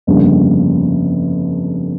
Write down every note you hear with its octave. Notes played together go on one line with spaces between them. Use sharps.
G1 F2 C#3 G3 A#3